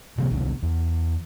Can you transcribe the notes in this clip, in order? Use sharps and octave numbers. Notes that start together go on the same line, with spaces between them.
C3 E3 F#3 A#3
C2 B2 D3
E2